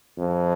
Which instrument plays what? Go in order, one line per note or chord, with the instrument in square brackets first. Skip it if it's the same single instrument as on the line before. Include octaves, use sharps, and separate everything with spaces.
[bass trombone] F2